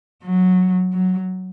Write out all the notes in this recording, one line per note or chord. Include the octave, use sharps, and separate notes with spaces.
F#3
F#3